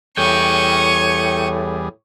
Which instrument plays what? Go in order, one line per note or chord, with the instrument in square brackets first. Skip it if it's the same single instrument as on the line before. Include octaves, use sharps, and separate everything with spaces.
[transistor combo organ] E2 G3 G#4 [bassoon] A2 [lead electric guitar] C#5 G5 [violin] C#6 D#7